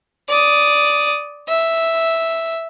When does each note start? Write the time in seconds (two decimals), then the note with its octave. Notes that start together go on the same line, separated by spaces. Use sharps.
0.29 D5 D#6
1.48 E5